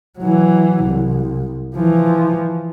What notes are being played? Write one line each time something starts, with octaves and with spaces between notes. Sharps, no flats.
E3 F#3
C2
E3 F3